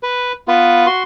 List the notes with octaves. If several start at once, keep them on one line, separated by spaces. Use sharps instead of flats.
B4
B3 F4 B4
F#4 C6